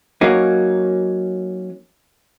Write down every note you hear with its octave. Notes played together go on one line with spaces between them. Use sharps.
F#3 A#3 C#4 D#4